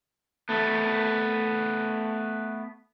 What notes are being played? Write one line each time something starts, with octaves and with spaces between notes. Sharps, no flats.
A3 B3